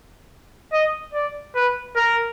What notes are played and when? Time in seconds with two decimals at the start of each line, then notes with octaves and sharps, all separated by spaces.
0.73 D#5
1.14 D5
1.55 B4
1.96 A#4